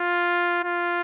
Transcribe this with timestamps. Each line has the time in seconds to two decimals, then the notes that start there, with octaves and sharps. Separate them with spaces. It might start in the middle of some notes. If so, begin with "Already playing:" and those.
Already playing: F4
0.64 F4